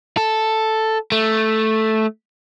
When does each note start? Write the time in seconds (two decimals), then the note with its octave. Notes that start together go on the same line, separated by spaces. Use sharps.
0.17 A4
1.12 A3